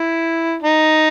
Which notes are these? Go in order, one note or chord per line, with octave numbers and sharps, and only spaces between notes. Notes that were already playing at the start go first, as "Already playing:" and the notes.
Already playing: E4
D#4